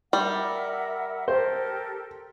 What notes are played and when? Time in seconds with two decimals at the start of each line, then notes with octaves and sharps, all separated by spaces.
0.13 G3 A#4 E5 F#5
1.28 G4 A4 A#4 C5